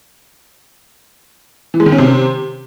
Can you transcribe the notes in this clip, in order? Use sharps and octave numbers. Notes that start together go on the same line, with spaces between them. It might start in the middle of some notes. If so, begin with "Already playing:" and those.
E3
G#3
D#3
C#4
C3